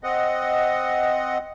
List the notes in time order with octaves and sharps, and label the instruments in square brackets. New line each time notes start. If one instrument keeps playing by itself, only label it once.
[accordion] C4 D#5 F#5